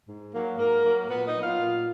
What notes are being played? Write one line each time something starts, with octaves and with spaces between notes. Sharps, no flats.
G#2
F#3 A#3
G#2 A#3 A#4
F#3 A#3
A#2 B3 B4
D#4 D#5
F#3 B3
F4 F5
A#2